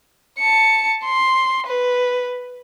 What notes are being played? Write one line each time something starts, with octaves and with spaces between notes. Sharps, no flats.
A5 C#7
C6
B4